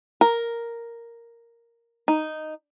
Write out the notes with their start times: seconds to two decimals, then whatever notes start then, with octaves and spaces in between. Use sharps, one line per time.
0.21 A#4
2.08 D#4